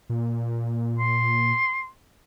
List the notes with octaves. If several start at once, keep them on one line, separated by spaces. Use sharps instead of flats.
A#2
C6